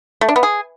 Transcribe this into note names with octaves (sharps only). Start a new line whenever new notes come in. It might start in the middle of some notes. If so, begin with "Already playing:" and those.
A3
D4
B3
G#4